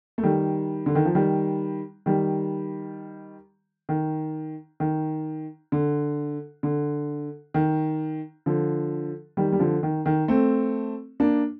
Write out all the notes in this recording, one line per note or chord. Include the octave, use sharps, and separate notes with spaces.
A3
D#3 G3
D3
D#3
F3
D#3 G3
D#3 G3
D#3
D#3
D3
D3
D#3
D3 F3
D#3 G3
G3
D3 F3
D#3
D#3
A3 C4
A#3 D4